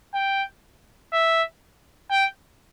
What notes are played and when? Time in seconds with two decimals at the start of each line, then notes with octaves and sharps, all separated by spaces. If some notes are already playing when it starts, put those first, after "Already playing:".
0.15 G5
1.13 E5
2.11 G5